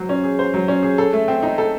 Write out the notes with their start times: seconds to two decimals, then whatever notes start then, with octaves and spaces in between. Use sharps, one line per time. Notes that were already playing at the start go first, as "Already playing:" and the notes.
Already playing: F#3 C5
0.09 C#4
0.24 G#4
0.39 C5
0.54 F#3
0.68 C#4
0.83 G#4
0.98 A4
1.13 A3
1.28 C4
1.43 D#4
1.58 A4